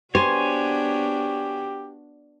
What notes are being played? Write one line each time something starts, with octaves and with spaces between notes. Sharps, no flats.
B3 D4 F#4 G4 C5 C#5 G#5